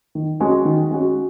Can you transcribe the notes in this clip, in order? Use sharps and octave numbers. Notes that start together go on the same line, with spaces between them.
D#3
G#3 C#4 F#4
D#3
G#3 C#4 F#4